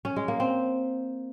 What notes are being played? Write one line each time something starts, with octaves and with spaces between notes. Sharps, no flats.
C#4
G#3
A#3
C4